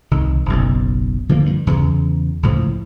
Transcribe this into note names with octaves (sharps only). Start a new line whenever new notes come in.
C2 D#3
F#1 B1
D3 F3 A#3
G2
E2 C#3
C#2 A2 F3